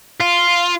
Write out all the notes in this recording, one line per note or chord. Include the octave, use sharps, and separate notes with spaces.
F4